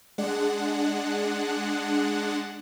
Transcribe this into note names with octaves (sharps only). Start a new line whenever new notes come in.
G#3 D4 F#5